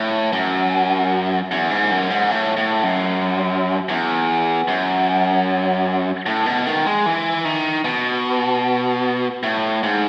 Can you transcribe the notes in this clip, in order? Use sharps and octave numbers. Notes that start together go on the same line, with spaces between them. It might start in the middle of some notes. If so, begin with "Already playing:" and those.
Already playing: A2
F#2
E2
G#2
F#2
G#2
A2
A2
F#2
E2
F#2
A2
B2
D#3
G#3
E3
D#3
B2
A2
G#2